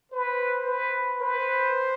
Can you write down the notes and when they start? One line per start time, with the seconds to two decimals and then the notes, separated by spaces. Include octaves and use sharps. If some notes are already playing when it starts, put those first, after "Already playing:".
0.12 B4 C5
0.66 B4
1.21 B4 C5